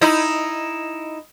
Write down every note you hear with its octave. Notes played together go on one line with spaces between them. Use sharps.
D#4 E4